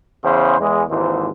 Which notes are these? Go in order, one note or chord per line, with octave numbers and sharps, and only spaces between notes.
E2 C#3 B4 C5
E2 G#3
G#1 D#2 G#2 E3 C5